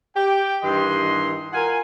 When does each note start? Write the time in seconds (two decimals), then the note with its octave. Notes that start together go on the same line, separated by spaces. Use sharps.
0.16 G4 G5
0.63 G2 D#3 E3 G4 D#5 C6
1.53 F4 A#4 F5 F#5 G#5